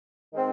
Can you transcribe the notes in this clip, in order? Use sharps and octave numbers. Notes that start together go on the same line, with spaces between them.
D#3 G#3 C4